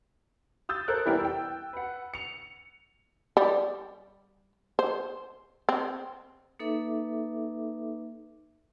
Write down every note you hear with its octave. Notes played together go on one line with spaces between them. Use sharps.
D#6 E6 G6 A6
A4 A#4 C5 F#6
E3 G3 B3 E4 G4 A#4
G5 E6
B4 F#5
C#7 F7
G3
C5
C4
A#3 D#4 A4 B4 E5 D6